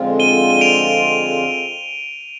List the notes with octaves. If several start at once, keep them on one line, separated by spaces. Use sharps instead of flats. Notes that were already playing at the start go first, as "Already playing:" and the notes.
Already playing: F2 D3 G#3 C4 F4
D#7 G7
G7
D7 F7